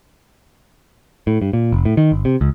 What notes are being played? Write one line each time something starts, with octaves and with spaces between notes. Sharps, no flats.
A2
G2
A#2
F1
A2
D#3
G1
C3
C#2